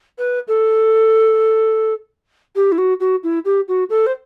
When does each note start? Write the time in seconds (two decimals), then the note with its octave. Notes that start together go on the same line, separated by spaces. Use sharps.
0.18 B4
0.48 A4
2.56 G4
2.72 E4
2.78 F#4
3.00 F#4
3.23 E4
3.45 G4
3.68 F#4
3.90 A4
4.06 C5